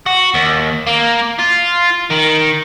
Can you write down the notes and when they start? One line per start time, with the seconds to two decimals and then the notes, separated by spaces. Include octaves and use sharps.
0.06 F#4
0.34 D#2
0.87 A#3
1.39 F4
2.10 D#3